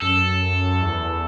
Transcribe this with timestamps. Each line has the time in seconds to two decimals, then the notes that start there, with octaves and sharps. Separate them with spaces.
0.02 F#2 A4
0.82 E2